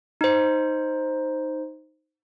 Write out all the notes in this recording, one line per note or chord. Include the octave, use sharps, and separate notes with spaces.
D#4 C5